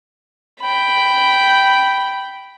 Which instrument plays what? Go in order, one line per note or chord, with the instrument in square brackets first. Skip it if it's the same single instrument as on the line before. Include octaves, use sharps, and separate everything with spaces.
[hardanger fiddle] G5 B5